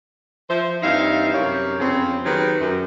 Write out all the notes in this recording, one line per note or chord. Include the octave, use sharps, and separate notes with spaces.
F3 C5 E5
G2 E3 C4 D#4 E5 F5
F#2 C3 A#4 C#5
F2 C#3 B3 C4
D#3 F#3 G4 G#4 B4
F#2